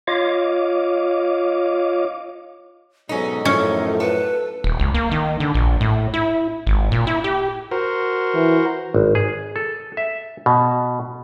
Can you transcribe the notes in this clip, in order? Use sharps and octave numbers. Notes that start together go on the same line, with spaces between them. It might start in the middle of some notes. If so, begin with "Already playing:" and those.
F4 C#5 D#5 F5 D6
G#2 B2 F#3 C#4 D#4 A4
F#2 A2 F3 C#4 D#4
A4 B4
D#1
C#2
A#3
D#3
D3
A#1
A2
E4
G#1
A#2
E4
G4
F#4 A#4 C5
E3
G#1
G#4
A4
E5
B2